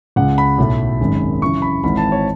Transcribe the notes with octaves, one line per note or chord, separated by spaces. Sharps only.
C#2 C#3 G#3 F#5
B5
B1 A2 F#3 A3
G#1 F#2 D#3 G#3
F#2 C#3 E3 C#6
B5
G#1 G#2 E3 B5
A5
C#5